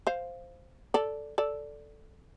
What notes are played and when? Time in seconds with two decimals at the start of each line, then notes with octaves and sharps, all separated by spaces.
0.07 C5 F5
0.94 A4 D5
1.38 A4 D5